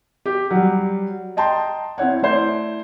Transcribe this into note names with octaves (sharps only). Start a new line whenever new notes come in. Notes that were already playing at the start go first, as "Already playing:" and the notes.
G4
F#3 G3
D#5 G5 A5 A#5 C6
C4 E4 C#5 F#5
A3 E4 C5 D5